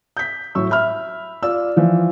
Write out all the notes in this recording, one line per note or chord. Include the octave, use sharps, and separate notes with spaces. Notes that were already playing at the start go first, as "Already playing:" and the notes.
G6 B6
A2 F#3 C#6 E6
E5 B5 F6
F4 D5 E6
E3 F3